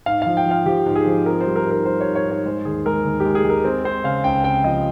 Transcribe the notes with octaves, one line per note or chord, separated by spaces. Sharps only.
G#2 F5
F3 F5
G5
F3 F5
F3 G4
G#2
G#4
F3
C4 A#4
G3 C5
A#4
G#2 A#4
G3 C5
C#5
G#2
C#5
G#2
C#5
G#3 C5
D#2 G#4
G#3 A#4
D#2
G#3 G4
G#4
G#3
A#4
C4
C4 C5
C#3 F5
C#2 G5
C4 G5
F3 D#5